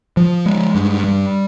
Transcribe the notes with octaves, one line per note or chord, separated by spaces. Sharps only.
F3
G#3
G2
G3